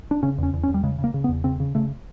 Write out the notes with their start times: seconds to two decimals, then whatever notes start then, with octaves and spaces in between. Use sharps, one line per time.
0.11 D4
0.23 C#3 C#4
0.38 E2 C#4
0.53 E2
0.63 C#4
0.68 E2
0.74 G3
0.83 C#3 G#3
0.98 C#3
1.04 A#3
1.14 C#3
1.24 B3
1.29 E2
1.44 C#3 C4
1.60 C#3
1.75 C#3 A3